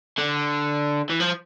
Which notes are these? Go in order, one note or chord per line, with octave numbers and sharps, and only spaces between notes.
D3
E3
F3